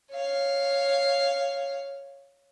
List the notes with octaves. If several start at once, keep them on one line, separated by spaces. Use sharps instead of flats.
C#5 F5